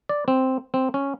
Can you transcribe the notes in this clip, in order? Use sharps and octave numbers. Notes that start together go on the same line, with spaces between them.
D5
C4
C4
C#4